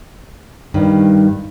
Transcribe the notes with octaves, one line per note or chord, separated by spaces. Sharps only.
G2 D#3